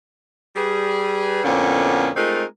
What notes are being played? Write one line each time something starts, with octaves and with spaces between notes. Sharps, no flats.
G3 G#4 B4
F2 A2 D3 A#3 B3 C#4
G#3 A3 C4 D#4 F4 A#4